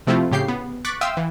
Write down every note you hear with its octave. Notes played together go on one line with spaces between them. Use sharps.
C3 F3 A3 C4 E4 F4
A2 C#3 G4 G6 C7
B3
C#6 D6 F#6 A6 B6
E5 F5 G5 C6 D#6 E6
E3